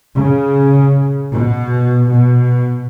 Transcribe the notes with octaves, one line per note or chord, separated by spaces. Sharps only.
C#3
B2
B2